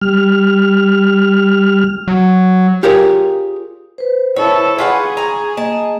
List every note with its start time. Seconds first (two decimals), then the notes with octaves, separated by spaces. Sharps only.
0.02 G3 F6
2.08 F#3
2.83 F4 G4 G#4 A#4 C#5
3.98 B4 C5
4.36 E4 A4 C#5
4.78 F4 G#4 B4 F#5 C#6
5.17 G#5 A#5
5.57 A#3 D#5 A5